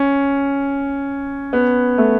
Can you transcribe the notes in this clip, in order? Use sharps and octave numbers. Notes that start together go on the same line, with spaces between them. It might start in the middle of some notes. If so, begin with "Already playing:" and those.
Already playing: C#4
B3
A3